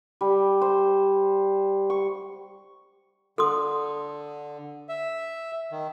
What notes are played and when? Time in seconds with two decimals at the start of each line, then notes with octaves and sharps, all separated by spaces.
0.21 G3
0.61 C5
1.90 C#6
3.38 D3 A4 C6 D#6
4.89 E5
5.71 D#3